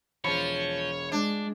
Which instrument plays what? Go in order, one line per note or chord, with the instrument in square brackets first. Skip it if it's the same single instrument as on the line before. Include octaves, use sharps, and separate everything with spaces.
[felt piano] E1 B5 [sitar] F3 [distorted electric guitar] C#5
[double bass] G#3 [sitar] D4